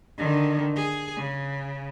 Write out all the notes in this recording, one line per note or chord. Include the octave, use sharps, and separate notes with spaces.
D3 D#3
G#4
C#3